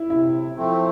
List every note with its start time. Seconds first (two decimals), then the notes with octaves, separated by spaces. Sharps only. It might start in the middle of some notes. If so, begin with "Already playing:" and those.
Already playing: E4
0.10 C3 E4
0.56 F3 A3 C4